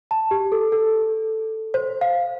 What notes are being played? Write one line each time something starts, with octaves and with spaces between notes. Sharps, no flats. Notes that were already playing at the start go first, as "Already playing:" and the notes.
A5
G4
A4
A4
C5
F5